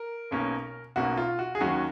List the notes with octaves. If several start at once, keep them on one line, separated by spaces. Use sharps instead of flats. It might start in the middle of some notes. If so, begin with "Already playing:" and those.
Already playing: A#4
B1 B2 A#3 C#4
B1 B2 A#3 C#4 F#4
F4
F#4
G#4
D#2 D#3 F#3 C#4 F#4